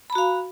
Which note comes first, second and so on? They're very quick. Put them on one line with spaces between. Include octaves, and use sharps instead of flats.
B5 A#5 F#4 F5